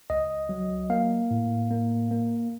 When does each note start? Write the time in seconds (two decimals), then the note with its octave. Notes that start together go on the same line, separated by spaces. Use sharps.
0.10 C#2 D#5
0.49 F#3
0.90 A#3 F5
1.31 A2
1.71 A#3
2.11 A#3